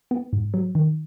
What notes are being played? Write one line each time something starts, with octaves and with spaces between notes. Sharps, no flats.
B3
G#2
F#3
D#3